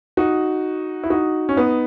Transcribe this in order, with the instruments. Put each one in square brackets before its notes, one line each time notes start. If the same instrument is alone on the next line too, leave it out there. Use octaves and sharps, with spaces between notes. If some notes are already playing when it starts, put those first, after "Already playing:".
[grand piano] D#4 F#4
E4
D#4 F#4
C#4
B3 D#4